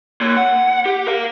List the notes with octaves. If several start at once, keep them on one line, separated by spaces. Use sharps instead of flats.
A#3 C#5
F#5
G4
A#4 F5